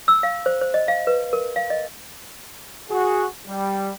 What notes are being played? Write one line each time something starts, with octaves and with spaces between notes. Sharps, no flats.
E6
F5
C5
C5
D#5
F5
B4
A#4
F5
D#5
F#4 G#4
G3